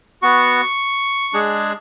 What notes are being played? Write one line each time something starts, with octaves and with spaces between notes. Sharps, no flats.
B3 F#4 C#6
G#3 D4 G#4